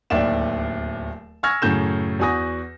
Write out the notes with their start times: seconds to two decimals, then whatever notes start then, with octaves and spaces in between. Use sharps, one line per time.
0.10 D1 D#2 D5 E5 E7
1.43 G#5 C#6 E6 F6 G#6 A#6
1.62 F#2 A2 C#3 G6 E7
2.19 E2 F#4 G#5 D#6 A#6